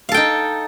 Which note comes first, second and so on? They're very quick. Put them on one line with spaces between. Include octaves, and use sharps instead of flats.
F5 A4 G5 D#4